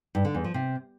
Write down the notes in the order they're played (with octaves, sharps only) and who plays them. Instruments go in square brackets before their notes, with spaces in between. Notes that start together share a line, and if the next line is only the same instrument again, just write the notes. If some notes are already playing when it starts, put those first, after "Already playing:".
[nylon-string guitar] G2
D3
E2
F3
C3